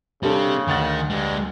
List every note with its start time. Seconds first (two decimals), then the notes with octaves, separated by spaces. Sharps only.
0.23 C#3 G3 C4 D4 G4 A4
0.68 D2 D#3 F#5 A6
1.10 G2 D3 G#3